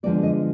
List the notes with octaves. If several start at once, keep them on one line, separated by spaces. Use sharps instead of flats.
D3 F3 G#3 B3 D5
D#5